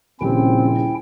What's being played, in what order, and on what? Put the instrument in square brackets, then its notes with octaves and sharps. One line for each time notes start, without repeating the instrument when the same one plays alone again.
[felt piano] D#1 C#3 G4 [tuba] A#1 [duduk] C4 [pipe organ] C#4 E4 G5